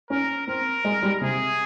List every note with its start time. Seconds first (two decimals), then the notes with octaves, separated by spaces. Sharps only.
0.10 C#4 A#4
0.47 C4 A#4
0.85 G#3
1.03 G3
1.21 C3 G#4